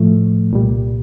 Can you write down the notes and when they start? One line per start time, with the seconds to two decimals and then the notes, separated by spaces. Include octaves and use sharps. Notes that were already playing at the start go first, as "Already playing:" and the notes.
Already playing: A2 F3 A3
0.51 C2 A#2 G3